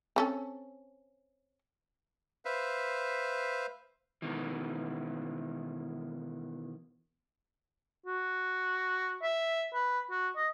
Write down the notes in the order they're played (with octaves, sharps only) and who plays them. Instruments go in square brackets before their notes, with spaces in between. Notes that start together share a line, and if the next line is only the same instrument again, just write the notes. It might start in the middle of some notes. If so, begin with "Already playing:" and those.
[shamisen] C4 C#4 A4
[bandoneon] B4 C5 E5 F5
[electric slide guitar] B2 D#3 E3
[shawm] F#4
E5
B4
F#4
D#5